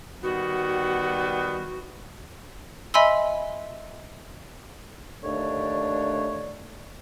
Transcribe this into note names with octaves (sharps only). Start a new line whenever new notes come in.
D#3 G3 B3 F#4
D#5 E5 G#5 B5 C6 E6
D#2 D3 A3 D4 C#5 D5